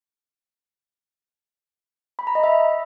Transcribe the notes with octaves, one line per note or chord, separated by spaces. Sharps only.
B5
A#5
D#5
E5